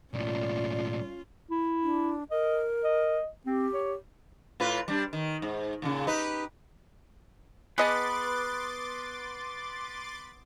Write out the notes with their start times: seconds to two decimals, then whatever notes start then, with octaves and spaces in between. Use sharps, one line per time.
0.14 B1 A2 C#4 F4 D5
1.51 E4
1.83 D4
2.31 A#4 D#5
2.84 D#5
3.46 C4 G4
3.74 C#5
4.60 A2 F4 B4
4.88 G3 D4
5.13 D#3
5.42 G#2
5.82 D#2 A#2 C#3
6.07 D#4 G4 B4
7.78 B3 G#4 B4 D#5 A5 C6 D6 A6